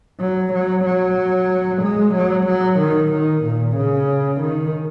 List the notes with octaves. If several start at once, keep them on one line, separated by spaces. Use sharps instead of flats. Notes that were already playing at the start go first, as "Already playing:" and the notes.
F#3
F#3
F#3
G#3
F#3
F#3
D#3
D#3
A#2
C#3
D#3